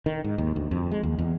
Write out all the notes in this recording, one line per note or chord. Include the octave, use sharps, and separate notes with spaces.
D#3
G#2
D#2
D2
F2
G#3
D#2
E2